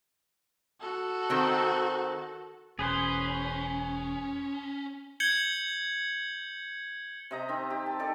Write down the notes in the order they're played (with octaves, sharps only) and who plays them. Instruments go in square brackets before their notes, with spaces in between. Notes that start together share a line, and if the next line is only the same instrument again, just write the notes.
[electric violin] F#4 A4
[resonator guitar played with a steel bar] D#3 C4
[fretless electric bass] E1 [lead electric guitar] C#4 [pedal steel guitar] G#4 B4 C5
[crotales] G6 G#6 C#7 F#7 G7
[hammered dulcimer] C3 D#5 A#5
D#3 C4
G4
A5
D#4 A4 D5